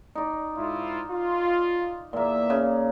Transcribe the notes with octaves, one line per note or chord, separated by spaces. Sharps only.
D#4 D5
G#2 E4 F4
F4
E2 A#2 A#3 E5
C#3